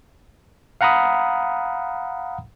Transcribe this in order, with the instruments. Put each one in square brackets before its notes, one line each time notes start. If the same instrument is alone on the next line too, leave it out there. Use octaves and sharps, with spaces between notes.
[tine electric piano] F5 F#5 A#5 B5 D#6